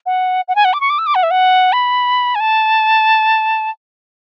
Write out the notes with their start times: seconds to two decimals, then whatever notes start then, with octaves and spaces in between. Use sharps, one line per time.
0.06 F#5
0.48 F#5
0.56 G#5
0.65 F#5
0.73 D6
0.81 C#6
0.90 D6
0.99 E6
1.07 D6
1.15 F#5
1.23 E5
1.31 F#5
1.73 B5
2.35 G#5
2.40 A5